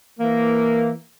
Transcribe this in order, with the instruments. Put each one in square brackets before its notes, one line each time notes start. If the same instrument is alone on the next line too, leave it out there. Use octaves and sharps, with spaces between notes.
[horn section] E3 A#3